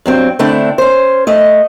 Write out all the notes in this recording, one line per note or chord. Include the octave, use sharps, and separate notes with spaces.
G2 F#3 C4
D3 A3 C4 D4 E4
C#4 C5
A3 D#5